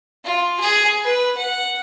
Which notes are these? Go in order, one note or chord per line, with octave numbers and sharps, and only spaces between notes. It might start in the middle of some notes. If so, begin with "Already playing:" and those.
F4
G#4
B4
F#5